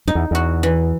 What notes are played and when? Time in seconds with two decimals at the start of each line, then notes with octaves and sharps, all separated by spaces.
0.07 F#2 D#4
0.15 E2
0.31 E2 F#4
0.63 E3